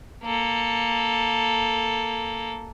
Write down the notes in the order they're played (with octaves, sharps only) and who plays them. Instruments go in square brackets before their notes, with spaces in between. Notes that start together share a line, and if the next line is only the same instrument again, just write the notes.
[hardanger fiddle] A#3 A4